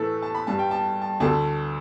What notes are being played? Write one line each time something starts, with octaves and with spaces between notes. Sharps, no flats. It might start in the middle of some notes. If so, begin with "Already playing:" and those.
Already playing: A2 E3 A3 A4 B4
A5
B5
G2 G3 A5
G5
A5
A5
D2 D3 A3 A5